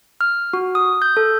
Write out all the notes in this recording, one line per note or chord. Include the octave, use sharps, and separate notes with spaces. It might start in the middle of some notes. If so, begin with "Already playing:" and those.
F6
F#4
D#6
G6
A4